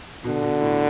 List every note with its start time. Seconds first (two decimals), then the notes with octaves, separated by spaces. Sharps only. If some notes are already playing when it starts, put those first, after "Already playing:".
0.24 B2 D3
0.43 B2
0.61 A2